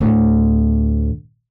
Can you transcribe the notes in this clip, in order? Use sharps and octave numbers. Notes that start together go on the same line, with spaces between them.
D2 A2